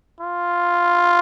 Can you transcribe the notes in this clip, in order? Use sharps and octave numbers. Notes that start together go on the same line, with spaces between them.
F4